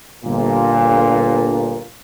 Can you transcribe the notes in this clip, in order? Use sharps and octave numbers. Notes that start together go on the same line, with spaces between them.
G1 A#2